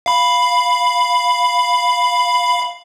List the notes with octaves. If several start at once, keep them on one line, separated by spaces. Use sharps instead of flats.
F5 B5